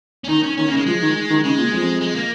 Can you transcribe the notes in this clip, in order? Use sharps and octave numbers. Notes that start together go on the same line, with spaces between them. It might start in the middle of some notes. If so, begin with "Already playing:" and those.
C#4
D#3 D#4
C#4
D#3 C#4
A#3
C#3
G#3
F3 G#3
D#3
D#3
C#3 G#3
A#2
F2
G#3
A#3